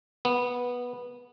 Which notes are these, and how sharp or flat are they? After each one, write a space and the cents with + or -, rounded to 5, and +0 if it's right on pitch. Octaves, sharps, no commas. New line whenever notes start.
B3 -10